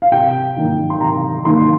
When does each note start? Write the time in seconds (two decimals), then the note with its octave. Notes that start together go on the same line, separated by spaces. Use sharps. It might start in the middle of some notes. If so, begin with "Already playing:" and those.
0.02 F5
0.12 C3 G5
0.57 D#3 A#3 D#4
0.90 C6
1.00 C3 A#5
1.45 D#3 A#3 D#4 C6